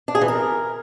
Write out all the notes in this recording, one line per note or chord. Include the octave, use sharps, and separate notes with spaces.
D4
G#4
E3
A#4